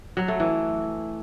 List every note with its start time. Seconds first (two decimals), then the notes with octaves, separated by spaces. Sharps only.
0.17 F#3
0.28 A3
0.40 E3